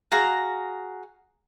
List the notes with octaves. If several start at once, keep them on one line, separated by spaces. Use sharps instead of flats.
F#4 G#4 F5 A#5